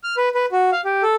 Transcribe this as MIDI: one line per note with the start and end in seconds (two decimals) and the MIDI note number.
0.04 0.16 89
0.17 0.29 71
0.35 0.46 71
0.52 0.71 66
0.72 0.81 77
0.85 1.03 67
1.03 1.15 69